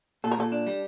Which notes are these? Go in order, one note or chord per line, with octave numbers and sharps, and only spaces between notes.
A#2 A4
A#4
A#2 A4
D4
G3